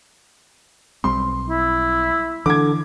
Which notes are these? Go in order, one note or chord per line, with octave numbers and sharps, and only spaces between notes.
B1 G3 C4 C6
E4
D3 E3 D6 G#6